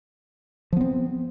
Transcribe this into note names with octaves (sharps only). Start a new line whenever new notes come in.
F3 B3 C4